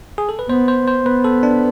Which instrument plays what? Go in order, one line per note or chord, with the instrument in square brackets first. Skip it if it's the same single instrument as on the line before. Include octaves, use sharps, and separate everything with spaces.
[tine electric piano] G#4
A4
B4
[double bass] B3 [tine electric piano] C5
[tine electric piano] C5
C5
[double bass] B3 [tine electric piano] B4
[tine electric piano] A4
D4